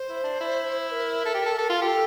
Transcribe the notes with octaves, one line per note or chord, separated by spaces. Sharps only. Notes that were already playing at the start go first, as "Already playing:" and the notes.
Already playing: C5
E4
D4
E4
C5
A#4
A4
G4
A4
A4
F4
G4 A4